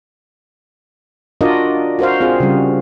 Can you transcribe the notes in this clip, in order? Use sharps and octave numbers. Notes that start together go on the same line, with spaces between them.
D4 F4 F#4 A#4 D5 D#5
F#4 A#4 C5 F5
C4 F4 G#4
C#3 G3